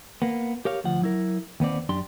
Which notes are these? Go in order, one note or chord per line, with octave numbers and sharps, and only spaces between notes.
A#3 B3
G4 A#4 C#5 F5
D2 F3 F#5
F#3 E4 A#4
D#2 B3 C4 D5
F#2 D4 G4 C6